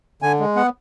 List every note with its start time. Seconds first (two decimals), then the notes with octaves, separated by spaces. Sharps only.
0.22 D3 G#5
0.39 G#3
0.56 B3 F#5